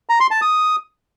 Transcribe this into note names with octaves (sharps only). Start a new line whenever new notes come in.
A#5
C6
A5
D#6